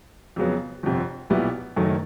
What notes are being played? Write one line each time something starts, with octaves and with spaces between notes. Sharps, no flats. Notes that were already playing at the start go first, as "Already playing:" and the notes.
F2 C#3 F#3 B3
G1 F2 C3
B1 A#2 G3 B3 E4
F#1 F#2 D#3 F#3 A3